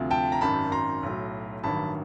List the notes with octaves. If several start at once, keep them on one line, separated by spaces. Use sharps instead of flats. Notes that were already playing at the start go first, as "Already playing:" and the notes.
Already playing: D2 C3 F3
G5 A5
A#5
G#1 F#2 D#3 A5 B5
A#5 C6
B1 A2 F#3
A1 G2 D#3 F#3 A5 B5